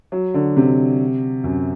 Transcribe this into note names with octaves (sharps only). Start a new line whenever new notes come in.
F#3
D3
C3
F#2